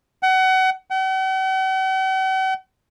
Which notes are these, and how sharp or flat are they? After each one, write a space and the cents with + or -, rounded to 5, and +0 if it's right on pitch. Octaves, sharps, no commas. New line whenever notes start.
F#5 +30
F#5 +45